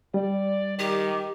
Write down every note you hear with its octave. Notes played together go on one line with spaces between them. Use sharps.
G3 D5
D#3 G4